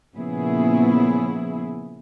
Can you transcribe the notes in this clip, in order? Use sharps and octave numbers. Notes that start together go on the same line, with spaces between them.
A#2 C#3 F3 B3 E4 G#4